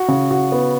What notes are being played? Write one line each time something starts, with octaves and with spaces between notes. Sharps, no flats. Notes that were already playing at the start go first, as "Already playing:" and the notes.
Already playing: F#4
C#3
F#4
B3